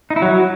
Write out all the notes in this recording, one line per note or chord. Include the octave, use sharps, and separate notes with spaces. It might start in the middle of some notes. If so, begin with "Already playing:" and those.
D#4
E4
F#3